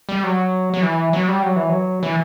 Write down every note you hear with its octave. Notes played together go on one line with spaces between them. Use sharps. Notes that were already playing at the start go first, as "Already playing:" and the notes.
G3
F#3
F#3
E3
F#3
G3
F#3
E3
F#3
E3